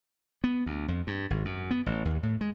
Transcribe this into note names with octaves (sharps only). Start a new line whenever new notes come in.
B3
D2
F2
G2
G#1
F#2
B3
A1
D#2
A2
G#3